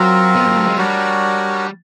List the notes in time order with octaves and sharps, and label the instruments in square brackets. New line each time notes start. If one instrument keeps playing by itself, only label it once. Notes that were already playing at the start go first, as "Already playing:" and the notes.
Already playing: [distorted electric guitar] F#3 [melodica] C4 F4 A#4
[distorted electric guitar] B3
A#3
A3
G#3
[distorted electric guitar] G3 [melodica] D4 F#4 A#4 C#5